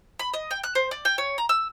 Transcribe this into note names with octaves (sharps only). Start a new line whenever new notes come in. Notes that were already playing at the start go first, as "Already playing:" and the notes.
B5
D#5
G5
F#6
C5
D5
G5
C#5
A#5
E6